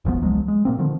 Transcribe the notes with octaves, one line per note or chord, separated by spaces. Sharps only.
E1 A1 F3 B3
C#2 F3 F#3 G#3
G#3
A#2 A#3 C4
D3 D#3 F3